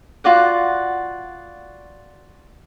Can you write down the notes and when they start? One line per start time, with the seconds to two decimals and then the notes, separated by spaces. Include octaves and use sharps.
0.24 F4 F#4 D5 F#5